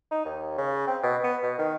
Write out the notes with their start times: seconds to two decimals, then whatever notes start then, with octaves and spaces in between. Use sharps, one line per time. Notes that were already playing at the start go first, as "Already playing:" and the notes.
0.11 D#4
0.25 D#2
0.58 C#3
0.87 C4
1.03 B2
1.24 B3
1.43 B2
1.58 D#3